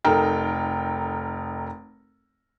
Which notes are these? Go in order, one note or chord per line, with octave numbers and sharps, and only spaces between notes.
F1 D#4 A4 A#4 G5